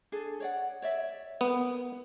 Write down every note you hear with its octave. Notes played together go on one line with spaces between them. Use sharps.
D4 G#4 A4
C#5 D5 F#5
C#5 D5 E5
B3 A#4